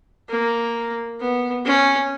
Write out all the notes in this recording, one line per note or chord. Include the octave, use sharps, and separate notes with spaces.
A#3
B3
C#4